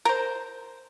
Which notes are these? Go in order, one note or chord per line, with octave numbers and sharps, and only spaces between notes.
A#4 C5